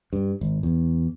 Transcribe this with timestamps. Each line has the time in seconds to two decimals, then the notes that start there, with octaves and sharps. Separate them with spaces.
0.13 G2
0.41 G#1
0.63 E2